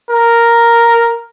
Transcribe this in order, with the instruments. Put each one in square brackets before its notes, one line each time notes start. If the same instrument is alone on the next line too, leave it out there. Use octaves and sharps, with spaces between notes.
[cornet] A#4